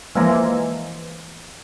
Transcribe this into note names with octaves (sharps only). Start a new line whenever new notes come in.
E3 F3 G#3 A#3